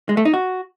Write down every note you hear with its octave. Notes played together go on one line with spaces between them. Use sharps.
G#3
A3
D#4
F#4